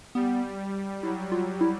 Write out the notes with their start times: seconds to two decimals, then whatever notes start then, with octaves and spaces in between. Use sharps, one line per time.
0.15 G3 B3
1.03 F#3 E4
1.32 F#3 F4
1.61 E4